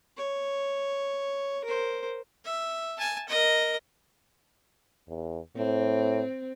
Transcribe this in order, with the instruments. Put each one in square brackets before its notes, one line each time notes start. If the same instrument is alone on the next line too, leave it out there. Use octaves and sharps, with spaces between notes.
[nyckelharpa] C#5
A#4 C5
E5
G#5 A5
A#4 D#5
[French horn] E2
[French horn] A2 [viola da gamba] C4